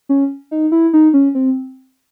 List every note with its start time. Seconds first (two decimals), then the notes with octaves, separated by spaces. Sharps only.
0.09 C#4
0.51 D#4
0.72 E4
0.93 D#4
1.14 C#4
1.35 C4